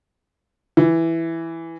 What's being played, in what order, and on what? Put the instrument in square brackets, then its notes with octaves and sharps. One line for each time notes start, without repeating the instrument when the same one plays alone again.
[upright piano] E3